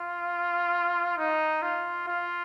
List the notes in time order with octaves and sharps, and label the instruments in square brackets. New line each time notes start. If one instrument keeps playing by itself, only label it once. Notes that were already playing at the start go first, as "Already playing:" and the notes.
Already playing: [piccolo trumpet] F4
D#4
F4
F4